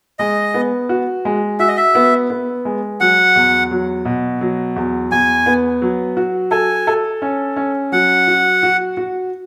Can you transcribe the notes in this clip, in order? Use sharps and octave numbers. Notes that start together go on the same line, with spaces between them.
G#3 D#5
B3
F#4
G#3
F#4 E5
D#5
E5
B3
B3
G#3
F#3 F#5
E2
F#3
B2
F#3
E2
E2 G#5
B3
F#3
F#4
A4 G#5
A4
C#4
C#4
F#3 F#5
F#4
F#4
F#4